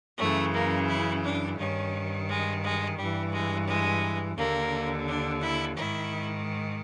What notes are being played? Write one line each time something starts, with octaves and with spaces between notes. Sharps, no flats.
F#2 C#3 E3 A3
A#3
E4
D4
G2 D#3 C#4
G#3
G#3
G2 E3 G3
G#3
G#3
D#2 D3 A#3
D4
E4
G#2 D#3 E4